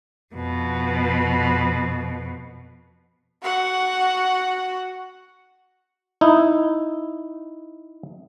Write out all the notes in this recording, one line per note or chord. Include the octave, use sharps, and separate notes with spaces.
F2 B2
F#4 F#5
D#4 E4